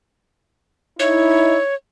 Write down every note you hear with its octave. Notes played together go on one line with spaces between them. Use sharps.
D#4 E4 C#5